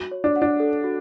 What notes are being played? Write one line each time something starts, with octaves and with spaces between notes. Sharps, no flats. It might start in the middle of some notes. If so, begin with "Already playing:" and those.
Already playing: F#4
C#5
D4
F#5
D4
A4
F#4